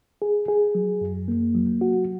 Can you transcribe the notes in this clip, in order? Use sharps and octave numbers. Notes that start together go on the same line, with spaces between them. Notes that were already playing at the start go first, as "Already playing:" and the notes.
G#4
G#4
F#3
F#2
A#3
F#3
F#4